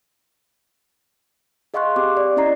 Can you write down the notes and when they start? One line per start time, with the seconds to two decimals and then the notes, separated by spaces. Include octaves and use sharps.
1.74 G#4 D#5 F5 C6 C#6 F#6
1.96 C4 G4 D6
2.17 D5
2.37 C#4 E4 D5 D#5 A#5 C7